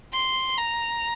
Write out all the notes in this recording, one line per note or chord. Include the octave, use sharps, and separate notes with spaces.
C6
A#5